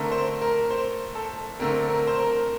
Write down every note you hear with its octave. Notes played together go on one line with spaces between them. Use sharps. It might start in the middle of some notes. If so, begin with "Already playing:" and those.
Already playing: D3 A3 C4 A#4
C5
A#4
C5
A4
D3 A3 C4 A#4
A#4
C5
A#4